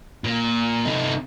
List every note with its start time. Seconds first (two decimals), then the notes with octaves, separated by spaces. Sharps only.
0.24 A#2
0.85 C3 D#4